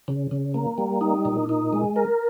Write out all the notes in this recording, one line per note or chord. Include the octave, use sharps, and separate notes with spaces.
C#3
C#3
A#3
G3
D#4
A#2
D#4
G#3
A#4